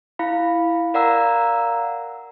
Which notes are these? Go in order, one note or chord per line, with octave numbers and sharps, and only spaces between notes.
E4 F5 B5
A#4 D5 F5 F#5 A#5 E6